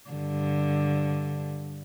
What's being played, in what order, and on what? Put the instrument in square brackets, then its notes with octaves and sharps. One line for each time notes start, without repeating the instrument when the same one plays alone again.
[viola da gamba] G2 D3